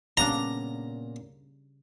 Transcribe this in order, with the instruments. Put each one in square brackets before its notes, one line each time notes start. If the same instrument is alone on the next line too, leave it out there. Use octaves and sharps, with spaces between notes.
[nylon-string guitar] A#2 B3 C#4 [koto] C#3 G3 D4 [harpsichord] A#5